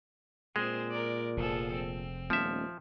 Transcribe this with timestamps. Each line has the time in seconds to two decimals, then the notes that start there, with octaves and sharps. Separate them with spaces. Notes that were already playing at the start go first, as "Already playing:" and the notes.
0.56 A#2 G#3 C4 G#4 C5
0.91 A#4 D5
1.37 F1 F3 G#4 A4
1.74 C4
2.30 D#1 F3 A3 B3 C#4 E5